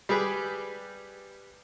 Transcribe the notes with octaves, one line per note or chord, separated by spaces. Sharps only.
G3 G4 G#4 B4